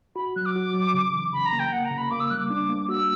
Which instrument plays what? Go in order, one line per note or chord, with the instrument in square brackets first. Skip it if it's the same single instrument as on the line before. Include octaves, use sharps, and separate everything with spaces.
[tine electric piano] F#4 [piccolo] B5
[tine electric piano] F#3 [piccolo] F#6
[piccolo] D6
[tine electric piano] F#4
F#3
C#3
E3
[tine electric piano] C#3 [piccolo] B5
[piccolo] A#5
[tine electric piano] A#3
[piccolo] G5
[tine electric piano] A#3 [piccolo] F#5
[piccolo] A#5
[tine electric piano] C#3
[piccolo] B5
[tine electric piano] A#3 [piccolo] D6
[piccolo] E6
[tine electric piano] G3 [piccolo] F#6
[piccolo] D6
[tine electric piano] D4 [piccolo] D6
[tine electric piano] A#3
[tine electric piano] F#4 [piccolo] E6